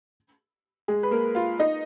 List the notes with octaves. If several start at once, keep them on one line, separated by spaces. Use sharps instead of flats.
G#3 G#4
B4
A#3 A#4
F4 F5
D#4 D#5